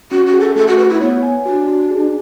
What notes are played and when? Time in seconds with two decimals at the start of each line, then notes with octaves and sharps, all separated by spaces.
0.11 C#4 F#4
0.27 F#4
0.33 G#4
0.40 A4
0.56 A3 A4
0.68 F#4
0.78 F#4 B4
0.90 E4
1.01 B3 C#5
1.23 G#5
1.46 D4 F#4
1.68 F#4
1.90 G#4